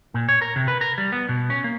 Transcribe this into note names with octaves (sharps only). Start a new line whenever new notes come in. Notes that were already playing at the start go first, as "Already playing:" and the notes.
A#2
C#5
A#4
C3
B4
A#4
G3
B3
B2
C#4
A#3